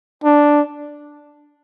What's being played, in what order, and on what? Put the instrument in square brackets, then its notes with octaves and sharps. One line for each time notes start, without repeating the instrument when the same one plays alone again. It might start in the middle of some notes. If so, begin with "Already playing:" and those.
[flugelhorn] D4